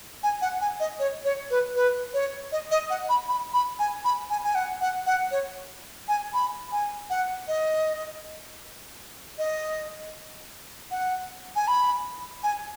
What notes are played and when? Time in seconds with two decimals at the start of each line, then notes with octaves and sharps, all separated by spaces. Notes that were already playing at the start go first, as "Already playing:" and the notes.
0.23 G#5
0.42 F#5
0.61 G#5
0.80 D#5
0.99 C#5
1.25 C#5
1.51 B4
1.76 B4
2.14 C#5
2.52 D#5
2.71 D#5
2.90 F#5
3.09 B5
3.28 B5
3.53 B5
3.79 G#5
4.05 B5
4.30 G#5
4.44 G#5
4.55 F#5
4.81 F#5
5.07 F#5
5.31 C#5
6.08 G#5
6.34 B5
6.72 G#5
7.10 F#5
7.48 D#5
9.38 D#5
10.91 F#5
11.56 G#5
11.68 B5
12.43 G#5